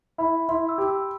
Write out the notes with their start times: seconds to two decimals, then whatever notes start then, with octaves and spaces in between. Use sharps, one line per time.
0.18 E4 B5
0.49 E4 C6
0.69 E6
0.78 G4
0.88 E6